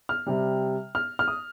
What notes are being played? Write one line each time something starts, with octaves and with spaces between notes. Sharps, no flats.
F6
C3 G3
F6
F6
D#6